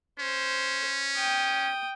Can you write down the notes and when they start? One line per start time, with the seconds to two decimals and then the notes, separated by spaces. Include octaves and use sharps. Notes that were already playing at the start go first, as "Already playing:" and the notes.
0.19 C#4 C5
1.16 G5 D#6